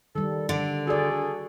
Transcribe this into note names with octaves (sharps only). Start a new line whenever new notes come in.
D#3 G3 A4
D3 D4
F#4 G#4 A4 D5